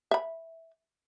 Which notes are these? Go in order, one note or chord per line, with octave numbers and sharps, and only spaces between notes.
E5 B5